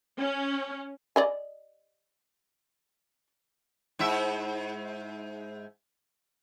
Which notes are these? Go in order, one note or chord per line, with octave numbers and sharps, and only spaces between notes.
C#4
D5 D#5 G#5
G#2 E4 E5